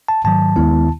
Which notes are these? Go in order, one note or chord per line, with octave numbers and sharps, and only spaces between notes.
A5
G#2 D#3 F#3 A5
D#2 D#3 G#3 B3 E4